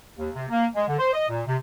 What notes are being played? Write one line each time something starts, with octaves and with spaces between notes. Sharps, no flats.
D#2
C3
A#3
G#3
D3
C5
D#5
A#2
C3